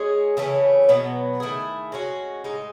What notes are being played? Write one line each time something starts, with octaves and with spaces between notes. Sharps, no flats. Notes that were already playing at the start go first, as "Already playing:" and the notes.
Already playing: G#3 C#4 G#4
C#3 E3 A3 C#4
B2 F#3 B3
D#3 A3 E4 G#4
G#3 C#4 F#4
A2 G#3 D#4